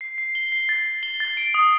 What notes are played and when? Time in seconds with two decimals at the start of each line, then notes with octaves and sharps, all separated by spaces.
0.01 C7
0.18 C7
0.35 G7
0.52 C7
0.69 A6
0.87 A6
1.03 G7
1.20 A6
1.37 D7
1.54 D#6